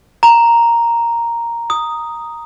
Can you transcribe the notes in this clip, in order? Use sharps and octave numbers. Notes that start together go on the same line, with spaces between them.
A#5
D#6